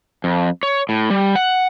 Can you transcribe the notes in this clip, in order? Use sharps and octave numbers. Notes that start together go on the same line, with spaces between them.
F2
C#5
A2
G3
F#5